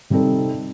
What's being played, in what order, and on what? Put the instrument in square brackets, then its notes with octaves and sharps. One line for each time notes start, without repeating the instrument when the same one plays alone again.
[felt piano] C3 G3 C4 D#4 A4